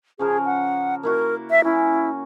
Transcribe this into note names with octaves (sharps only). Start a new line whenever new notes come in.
C#3 F3 G#4 A#4
F#5
A#3 E4 F#4 A#4
E5
C#4 E4